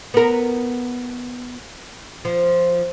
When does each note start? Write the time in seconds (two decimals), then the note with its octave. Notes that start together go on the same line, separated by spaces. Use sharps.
0.14 B3 A#4
2.25 F3